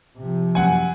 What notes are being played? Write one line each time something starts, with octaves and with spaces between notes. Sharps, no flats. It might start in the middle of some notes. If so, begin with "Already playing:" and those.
C3 F3
F#2 F#5 G#5